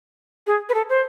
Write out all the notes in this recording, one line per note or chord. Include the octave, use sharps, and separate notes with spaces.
G#4
B4
A4
C5